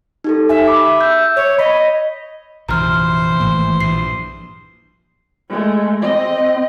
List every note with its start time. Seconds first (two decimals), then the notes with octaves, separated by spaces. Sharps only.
0.24 D#4 G4 A4
0.49 G4 E5 G#5
0.68 B5 D6
1.01 E6 G6
1.36 C#5
1.58 D#5 B5 B6
2.69 A#1 F#2 C3 E3 C5 A#5 F6
3.40 G#1 A2 A#3
3.81 A#1 G2 C7
5.49 G#3 A3
6.02 C4 D#5